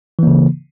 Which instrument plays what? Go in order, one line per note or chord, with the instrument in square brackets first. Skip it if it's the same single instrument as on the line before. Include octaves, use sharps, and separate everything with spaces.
[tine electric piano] E3
A#3
C#3